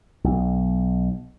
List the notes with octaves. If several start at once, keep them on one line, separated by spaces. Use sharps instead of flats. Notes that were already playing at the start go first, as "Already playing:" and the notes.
B1